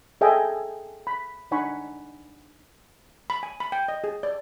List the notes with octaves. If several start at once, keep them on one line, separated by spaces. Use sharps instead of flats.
G#4 A4 D#5 E5 G5 G#5
B5
D4 D#4 F#5 G#5 B5 C#6
B5
G#5
B5
G5
D#5
G#4
D5